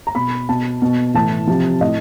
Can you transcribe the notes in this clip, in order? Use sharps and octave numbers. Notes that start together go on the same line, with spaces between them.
A#5
B2 B5
B2 A5
B2
A2 E3 A5
C3 F3
A2 D#5